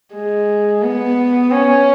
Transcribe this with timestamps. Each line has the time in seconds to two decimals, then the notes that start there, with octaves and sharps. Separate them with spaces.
0.14 G#3
0.83 B3
1.51 C#4